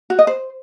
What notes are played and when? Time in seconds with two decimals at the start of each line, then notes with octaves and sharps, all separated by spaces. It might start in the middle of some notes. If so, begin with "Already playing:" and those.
0.10 F#4
0.19 D#5
0.27 C5